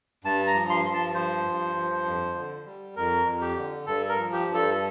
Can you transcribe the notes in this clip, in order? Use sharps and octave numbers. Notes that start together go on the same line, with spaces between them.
G2 A5
A#5
F3
C6
G2
A5
F3 C5
G2
F3
F2
D3
G3
F2 A#4
F2
G4
D3
G2 A4
A#4
F3
G4
G2
A4